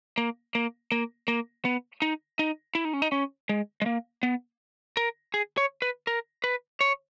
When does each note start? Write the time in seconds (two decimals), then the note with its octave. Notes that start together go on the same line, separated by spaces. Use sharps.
0.18 A#3
0.55 A#3
0.92 A#3
1.28 A#3
1.65 B3
2.02 D#4
2.39 D#4
2.75 E4
2.85 D#4
2.93 C#4
3.02 D#4
3.12 C#4
3.49 G#3
3.82 G#3
3.86 A#3
4.23 B3
4.97 A#4
5.34 G#4
5.57 C#5
5.82 B4
6.07 A#4
6.44 B4
6.81 C#5